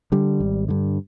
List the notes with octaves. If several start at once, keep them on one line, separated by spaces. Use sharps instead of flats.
D3 G3
G#1
G2 D3